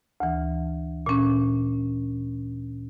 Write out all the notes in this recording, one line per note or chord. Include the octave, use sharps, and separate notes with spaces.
D2 E3
A#2 C#4